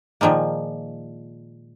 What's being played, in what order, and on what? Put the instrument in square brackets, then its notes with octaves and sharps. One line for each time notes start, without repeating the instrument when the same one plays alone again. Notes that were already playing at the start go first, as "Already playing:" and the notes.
[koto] A#2 D#3 F3 G#3 A#3